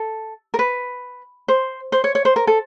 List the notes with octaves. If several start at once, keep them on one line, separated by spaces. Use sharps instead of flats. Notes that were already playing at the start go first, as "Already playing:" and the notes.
Already playing: A4
A#4
B4
C5
C5
C#5
C#5
C5
A#4
A4